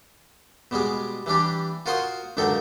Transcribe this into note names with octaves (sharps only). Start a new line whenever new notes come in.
B2 G3 G#3 G#4
E3 G3 D4 G4
F4 F#4 A#4 C5 C6 D#6
C#2 F#2 D3 D#4 A4 G5